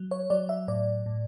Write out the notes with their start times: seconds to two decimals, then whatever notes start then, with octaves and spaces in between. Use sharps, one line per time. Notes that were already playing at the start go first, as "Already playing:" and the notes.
Already playing: F#3
0.11 C#5
0.30 F#3 D5
0.49 E5
0.68 A2 D5
1.06 A2